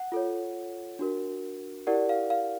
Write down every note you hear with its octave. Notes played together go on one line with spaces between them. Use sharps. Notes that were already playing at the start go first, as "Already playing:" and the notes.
Already playing: F#5
F4 A4 C#5
D4 F#4 A#4
E4 G4 A#4 D5 F#5
F5
F5